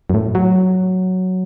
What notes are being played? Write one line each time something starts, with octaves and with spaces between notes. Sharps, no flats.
F#2
A2
F#3